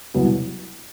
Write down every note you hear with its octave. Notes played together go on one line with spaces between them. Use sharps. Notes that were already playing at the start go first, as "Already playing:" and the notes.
C2 B2 F#3 B3 E4